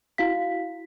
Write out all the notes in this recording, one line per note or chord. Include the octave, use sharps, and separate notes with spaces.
E4 F#4 F5 B6